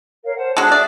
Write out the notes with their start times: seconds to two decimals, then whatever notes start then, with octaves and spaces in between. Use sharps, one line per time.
0.24 A#4 C#5 F5
0.37 C5 F#5 A5
0.57 G#3 D4 F#4 G#4 A4 F#6
0.72 G#4 D5 E5